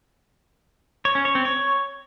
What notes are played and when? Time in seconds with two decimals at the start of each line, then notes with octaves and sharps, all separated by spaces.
1.05 C#5
1.15 C#4
1.25 C#5
1.35 C4
1.45 C#5